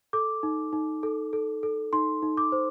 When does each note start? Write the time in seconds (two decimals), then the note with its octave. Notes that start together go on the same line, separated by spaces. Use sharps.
0.13 A4 D6
0.43 D#4
0.73 D#4
1.03 A4
1.33 A4
1.63 A4
1.93 D#4 C6
2.22 D#4
2.37 D6
2.52 C5